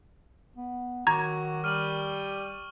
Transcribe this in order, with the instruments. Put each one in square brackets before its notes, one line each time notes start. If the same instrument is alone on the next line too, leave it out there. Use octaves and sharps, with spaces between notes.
[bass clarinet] B3
[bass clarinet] D#3 [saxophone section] F#3 F#4 [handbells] A#5 G#6 [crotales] C#6 D6
[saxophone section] G3 [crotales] F6 D#7 F#7